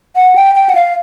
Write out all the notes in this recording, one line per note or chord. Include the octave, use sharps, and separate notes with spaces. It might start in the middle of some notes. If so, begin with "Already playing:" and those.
F#5
G5
G5
F#5
F5